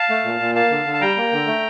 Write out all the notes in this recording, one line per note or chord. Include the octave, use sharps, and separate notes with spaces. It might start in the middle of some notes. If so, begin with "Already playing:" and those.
Already playing: F5 A5
A3
A#2
A#2
A#3 F5 A5
D3
D3
A5
G3 G5 A#5
A#3
D3
A3